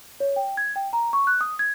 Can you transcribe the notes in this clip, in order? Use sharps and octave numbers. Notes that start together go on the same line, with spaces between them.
C#5
G5
G#6
G5
A#5
C#6
F#6
D#6
G#6